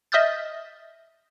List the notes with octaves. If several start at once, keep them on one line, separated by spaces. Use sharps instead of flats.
D#5 E5 D#6 F6 G6 A6